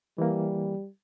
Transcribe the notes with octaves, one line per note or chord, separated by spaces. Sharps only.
E3 G3 A#3